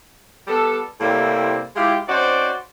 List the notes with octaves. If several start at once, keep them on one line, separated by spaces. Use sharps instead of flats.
G3 B3 G4 A4
A2 C3 G3 A#3 C4 E4
G#3 E4 F4 G4
C4 C#4 D#4 F#4 C5 D5